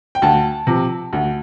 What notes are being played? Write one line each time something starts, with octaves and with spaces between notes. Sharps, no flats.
G5
D2 A5
C3 F3
D2